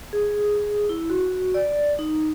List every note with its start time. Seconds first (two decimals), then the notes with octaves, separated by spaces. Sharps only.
0.13 G#4
0.89 E4
1.10 F#4
1.54 D5
1.99 D#4